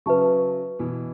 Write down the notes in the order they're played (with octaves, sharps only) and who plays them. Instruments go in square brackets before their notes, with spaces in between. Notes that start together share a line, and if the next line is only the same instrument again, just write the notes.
[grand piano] C#3 F#3 [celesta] B4 E5 A5 C#6
[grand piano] B2 E3